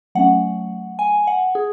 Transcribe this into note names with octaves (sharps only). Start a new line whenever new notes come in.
F#3 A3 C#4 F#5
G#5
F#5
G#4